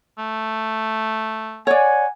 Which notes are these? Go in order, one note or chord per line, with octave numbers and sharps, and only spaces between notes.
A3
C#5 D5 F#5 G#5